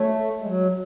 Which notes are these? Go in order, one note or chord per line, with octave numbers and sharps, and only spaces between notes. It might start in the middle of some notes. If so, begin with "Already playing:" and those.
Already playing: A3 F#4 C#5 E5 A5
G#3
F#3